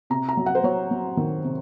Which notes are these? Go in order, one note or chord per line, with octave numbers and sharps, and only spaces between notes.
C3 A#5
A#5
F#3
F#5
C5
F#3 C#5
F#3
D#3
C3